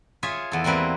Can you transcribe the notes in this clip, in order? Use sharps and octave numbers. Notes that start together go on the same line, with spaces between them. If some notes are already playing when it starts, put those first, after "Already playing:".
F4 G#4 C#5 E5
E2 A4
E3 G3 A#3 C4 B4